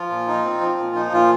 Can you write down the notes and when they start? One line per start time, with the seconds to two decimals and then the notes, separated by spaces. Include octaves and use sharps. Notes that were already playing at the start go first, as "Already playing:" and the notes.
Already playing: F3 F4
0.10 A#2
0.27 D#4
0.44 C4
0.61 F3
0.79 A#2
0.95 F3 D#4
1.12 A#2 F4